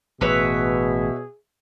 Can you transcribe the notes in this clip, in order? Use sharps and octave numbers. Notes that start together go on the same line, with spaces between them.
A1 B2 G#4 B4 C#5 E5